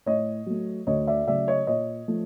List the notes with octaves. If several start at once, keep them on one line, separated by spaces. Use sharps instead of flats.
A2 C#5 D#5
F#3 A3
D2 C#5 D#5
D5 E5
C#3 F#3 A3 D5 E5
C#5 D#5
A#2 C#5 D#5
F3 A3